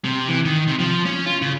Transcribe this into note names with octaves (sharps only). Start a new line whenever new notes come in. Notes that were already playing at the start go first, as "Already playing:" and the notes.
C3
E3
D#3
C3
F3
C#4
F4
C#3